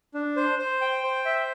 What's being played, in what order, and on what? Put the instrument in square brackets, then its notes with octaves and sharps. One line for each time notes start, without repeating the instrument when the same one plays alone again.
[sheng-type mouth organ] D4
C5
C5
G5
C5
E5